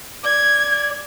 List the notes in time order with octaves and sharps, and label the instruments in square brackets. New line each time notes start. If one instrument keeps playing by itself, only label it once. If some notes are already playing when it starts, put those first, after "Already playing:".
[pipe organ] D5 [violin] G#6